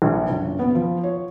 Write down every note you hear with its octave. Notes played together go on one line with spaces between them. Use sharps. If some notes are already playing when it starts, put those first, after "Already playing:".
A#1
F#1
B3
F3
C#5